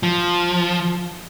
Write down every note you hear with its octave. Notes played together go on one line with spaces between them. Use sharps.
F3